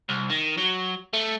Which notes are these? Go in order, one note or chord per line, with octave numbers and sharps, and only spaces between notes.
C2
D#3
F#3
A3